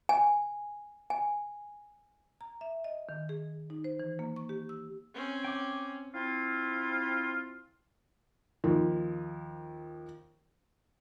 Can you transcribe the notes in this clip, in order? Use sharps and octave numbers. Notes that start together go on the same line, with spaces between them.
G#5
G#5
A#5
E5
D#5
D#3
G#4
D#4
C5
E3
A#3
C#6
G4
E6
C4 C#4
G5 D6
C4 E4 F4
D#2 F3